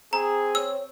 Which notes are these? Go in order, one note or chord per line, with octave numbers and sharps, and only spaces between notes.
C4 G#4 A#5
C#5 E6